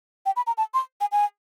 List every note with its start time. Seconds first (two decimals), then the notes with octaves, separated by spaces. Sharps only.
0.26 G5
0.36 B5
0.47 A#5
0.57 A5
0.74 C6
1.01 G#5
1.12 G#5